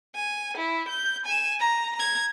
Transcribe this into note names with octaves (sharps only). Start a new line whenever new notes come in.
G#5
E4
G6
G#5 E7
A#5
A#5 G#6